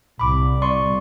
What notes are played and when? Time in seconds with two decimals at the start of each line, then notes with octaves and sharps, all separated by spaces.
0.19 C2 B5 D6
0.62 D5 C6 C#6